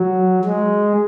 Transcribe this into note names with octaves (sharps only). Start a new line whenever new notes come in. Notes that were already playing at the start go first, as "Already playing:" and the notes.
Already playing: F#3
G#3